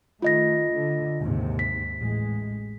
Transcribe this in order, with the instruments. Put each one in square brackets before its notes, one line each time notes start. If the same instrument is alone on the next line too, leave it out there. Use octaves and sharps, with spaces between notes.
[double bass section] D#3 A3 [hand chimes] F4 D#5 A#6
[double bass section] D3
D#2 G#2 C3
[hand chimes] B6
[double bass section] A1 G#3